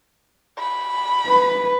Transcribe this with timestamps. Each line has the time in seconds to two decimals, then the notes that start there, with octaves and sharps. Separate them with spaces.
0.59 B5
1.27 B4